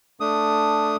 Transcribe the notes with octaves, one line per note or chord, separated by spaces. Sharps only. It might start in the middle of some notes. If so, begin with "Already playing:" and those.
A3 D4 D#6